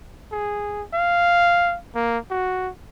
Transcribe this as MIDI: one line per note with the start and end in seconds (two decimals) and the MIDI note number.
0.32 0.83 68
0.94 1.77 77
1.95 2.18 58
2.30 2.70 66